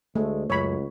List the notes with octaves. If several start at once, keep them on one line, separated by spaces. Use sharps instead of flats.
D2 G#3 A3
C#2 F#2 C#5 B5